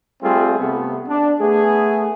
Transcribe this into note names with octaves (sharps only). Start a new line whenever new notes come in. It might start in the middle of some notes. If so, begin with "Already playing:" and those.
G3 A3 C4 F4 G#4
C3 A3 B3
D4
A3 B3 G#4